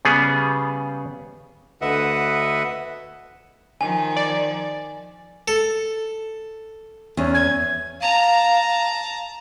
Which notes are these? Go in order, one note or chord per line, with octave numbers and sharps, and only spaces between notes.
C#3 G3 B3 G#4
D2 D3 B4 D#5 E5 F#5
D#3 F3 G#5
D5
A4
E2 C#4
G#6
F5 A5 A#5